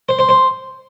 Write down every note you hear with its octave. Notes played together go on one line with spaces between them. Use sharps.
C5
C5
C5